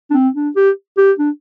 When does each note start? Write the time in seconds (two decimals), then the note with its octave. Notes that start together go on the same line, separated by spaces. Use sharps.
0.11 D4
0.14 C4
0.35 D4
0.56 G4
0.97 G4
1.19 D4